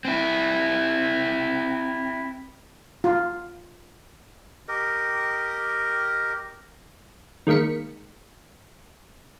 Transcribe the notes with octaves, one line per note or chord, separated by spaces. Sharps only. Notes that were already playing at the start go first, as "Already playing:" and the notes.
C4 E4
F4
G4 A#4 D#5
D#3 G#3 A#3 B6 C#7